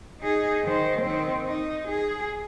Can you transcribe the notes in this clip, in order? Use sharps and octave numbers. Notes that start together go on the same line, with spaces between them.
D#4 G#4
D#3 C5
D#3 C4
D#4
G#4